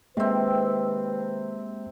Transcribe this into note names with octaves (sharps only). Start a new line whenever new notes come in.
C3 D#3 G#3 A#3 C4 B4